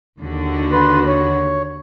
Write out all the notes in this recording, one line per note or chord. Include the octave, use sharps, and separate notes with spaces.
D#2 D3 F#4
B4 C6
C#5